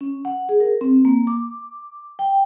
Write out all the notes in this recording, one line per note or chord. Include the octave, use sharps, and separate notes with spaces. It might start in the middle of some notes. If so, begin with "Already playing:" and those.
C#4
F#5
G#4
A#4
C4
A#3
D6
G5